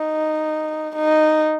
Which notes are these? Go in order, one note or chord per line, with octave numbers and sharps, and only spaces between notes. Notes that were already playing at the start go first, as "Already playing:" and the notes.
Already playing: D#4
D#4